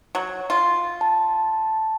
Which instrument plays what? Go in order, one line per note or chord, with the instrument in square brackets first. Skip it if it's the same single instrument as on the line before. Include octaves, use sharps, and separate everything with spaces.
[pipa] F#3
F4
[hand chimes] A5